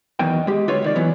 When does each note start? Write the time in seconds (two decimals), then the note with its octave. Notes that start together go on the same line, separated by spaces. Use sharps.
0.19 B1 E2 B2 D#3 D#4 G5
0.47 G#3 G4
0.68 D3 F4 B4 C#5
0.82 C2 D#3 D5
0.96 E3 F#3 B3